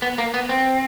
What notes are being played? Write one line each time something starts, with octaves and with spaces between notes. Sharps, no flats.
B3
A#3
B3
C4